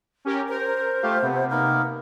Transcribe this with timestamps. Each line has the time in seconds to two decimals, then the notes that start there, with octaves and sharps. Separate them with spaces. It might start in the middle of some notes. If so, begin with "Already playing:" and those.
0.25 C#4 G4 A#4
0.49 A#4 C5
1.03 A3 F4 G4 F5
1.22 C3 B3
1.50 A#3 B3 D#4 A#4